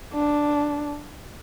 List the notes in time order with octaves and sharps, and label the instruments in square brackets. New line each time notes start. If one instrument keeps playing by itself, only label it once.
[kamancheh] D4